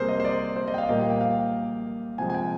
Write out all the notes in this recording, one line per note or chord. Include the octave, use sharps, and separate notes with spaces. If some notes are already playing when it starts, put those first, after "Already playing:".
Already playing: C3 G3 A#3 G#4 A#4 C5
D#5
C5
D5
C5
D#5
G5
F5
A#2 G3 A#3 D#5
F5
G5
F5
C3 F3 G#3 G#5
G#5
G5